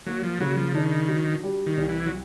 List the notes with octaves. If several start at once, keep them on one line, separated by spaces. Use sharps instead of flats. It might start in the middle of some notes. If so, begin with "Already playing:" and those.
F#3 A#3
F3
C#3 F#3
F3
D#3 D4
F#3
G3
D#3
C2
E3
F#3